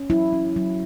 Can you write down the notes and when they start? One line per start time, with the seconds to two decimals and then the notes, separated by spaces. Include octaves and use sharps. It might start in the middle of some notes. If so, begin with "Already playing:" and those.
Already playing: C#4
0.10 F#3 E4
0.33 C#4
0.56 F#3